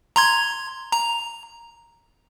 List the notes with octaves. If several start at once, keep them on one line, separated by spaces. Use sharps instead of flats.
A#5 C6 G#6
A#5